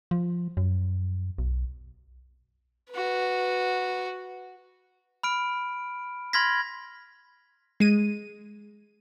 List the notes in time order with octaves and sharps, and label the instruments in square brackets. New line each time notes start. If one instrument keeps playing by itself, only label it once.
[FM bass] F3
F#2
B1
[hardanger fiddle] F#4 B4
[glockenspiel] B5 F6 D7
B5 C6 F6 G#6 A#6 B6
[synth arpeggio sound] G#3 D#7